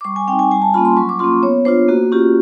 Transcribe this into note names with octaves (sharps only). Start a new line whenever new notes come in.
D6
G3 C#6
G#5
C4 D#4 G5
G#5
G3 G#5
A5
A#3 C#4 F4 B5
C6
F#3 C#6
D6
A#3 C#4 F4 C6
B3 C#5
D4 F4 C5
A#3 F#4
C#4 F4 G4